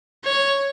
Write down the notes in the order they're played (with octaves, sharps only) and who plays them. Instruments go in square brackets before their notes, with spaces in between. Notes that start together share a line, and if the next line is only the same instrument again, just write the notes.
[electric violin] C#5